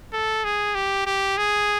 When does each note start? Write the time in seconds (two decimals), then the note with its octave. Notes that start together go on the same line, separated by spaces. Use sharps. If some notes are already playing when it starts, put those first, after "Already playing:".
0.13 A4
0.44 G#4
0.75 G4
1.06 G4
1.38 G#4